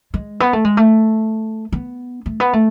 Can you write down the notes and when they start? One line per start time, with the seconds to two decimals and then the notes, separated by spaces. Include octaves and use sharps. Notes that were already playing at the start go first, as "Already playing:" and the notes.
0.14 G#3
0.40 B3
0.53 A3
0.65 G#3
0.77 A3
1.72 B3
2.26 A3
2.40 B3
2.53 A3